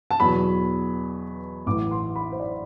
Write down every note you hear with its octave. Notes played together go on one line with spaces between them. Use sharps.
A5
E2 B2 F#3 B5
A1 A2 E3 D6
C6
B5
C5
D5